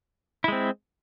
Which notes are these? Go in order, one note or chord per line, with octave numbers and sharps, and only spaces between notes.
G#3 C4 E4